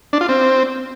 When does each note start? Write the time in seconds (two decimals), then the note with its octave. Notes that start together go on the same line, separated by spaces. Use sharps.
0.13 D4
0.21 F4
0.29 C4